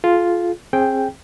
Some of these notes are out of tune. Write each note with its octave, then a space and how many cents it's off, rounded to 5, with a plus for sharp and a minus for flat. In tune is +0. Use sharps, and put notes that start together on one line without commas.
F4 +0 G#4 +40
C4 +35 G#4 +0 G5 +0